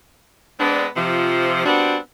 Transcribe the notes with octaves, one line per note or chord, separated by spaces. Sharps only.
G#3 B3 C4 D4
C3 F3
G3 B3 C4 D4 F#4